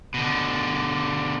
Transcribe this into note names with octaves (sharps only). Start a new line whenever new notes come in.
B2 D3